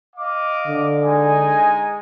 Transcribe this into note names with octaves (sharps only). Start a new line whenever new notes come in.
D#5 F5 D6
D3
G#3 D#4 G#5